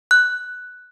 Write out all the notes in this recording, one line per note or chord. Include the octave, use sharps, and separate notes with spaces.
F#6